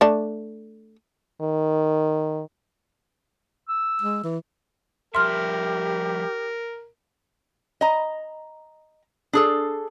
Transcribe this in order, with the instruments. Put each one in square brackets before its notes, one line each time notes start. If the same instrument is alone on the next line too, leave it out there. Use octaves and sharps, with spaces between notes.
[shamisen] A3 D4
[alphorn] D#3
[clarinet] E6
[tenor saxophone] G#3
E3
[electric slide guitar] F3 G3 E5 [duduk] G4 [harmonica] A#4 [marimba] C6 F6
[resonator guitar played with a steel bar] D#5 A#5
D4 G#4 A4